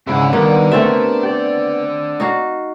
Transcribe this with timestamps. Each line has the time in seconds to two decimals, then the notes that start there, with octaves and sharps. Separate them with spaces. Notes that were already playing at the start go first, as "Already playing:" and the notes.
0.08 G#2 C#3 D4 E4 F#5
0.33 D#3 G3 A#3 B3 A#4
0.72 A3 C4 G4 A#4 E5 A5
1.23 D5 G5
2.20 D#4 F#4 F5